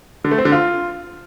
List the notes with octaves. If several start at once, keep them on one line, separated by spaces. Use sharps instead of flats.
D3
A3
C4
D3
F4